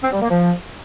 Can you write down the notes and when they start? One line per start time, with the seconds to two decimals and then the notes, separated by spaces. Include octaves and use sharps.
0.03 C4
0.12 G3
0.21 A#3
0.30 F3